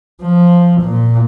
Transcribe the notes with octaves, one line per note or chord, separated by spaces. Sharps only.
F3
A#2